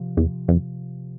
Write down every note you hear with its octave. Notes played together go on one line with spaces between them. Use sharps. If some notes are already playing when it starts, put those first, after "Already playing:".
Already playing: C3 F3
E2
F2